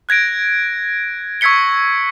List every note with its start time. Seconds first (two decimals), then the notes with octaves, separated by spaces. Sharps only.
0.09 F#6 G#6 A#6 D7
1.41 C#6 E6 G#6 B6 C#7 G7